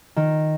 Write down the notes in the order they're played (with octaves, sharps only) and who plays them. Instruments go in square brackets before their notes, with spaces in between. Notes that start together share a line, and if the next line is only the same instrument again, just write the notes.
[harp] D#3